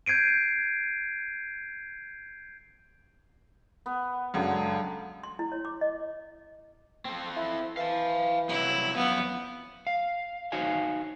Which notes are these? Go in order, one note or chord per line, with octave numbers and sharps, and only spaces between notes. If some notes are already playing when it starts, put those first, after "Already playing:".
G6 G#6 C7 D7 D#7
B3
C#2 F#2 D3 F#3
C6
E4
C#5
D6
D#5
C4 A4
E4
E3 F5 A5
C2 F#3 E4
F#2 F3 B3
F5
D#4 F#4 C5 C#5 F5 G#5